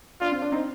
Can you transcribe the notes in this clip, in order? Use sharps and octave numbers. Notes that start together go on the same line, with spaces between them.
D4 F4
C4
D4
C4 D#4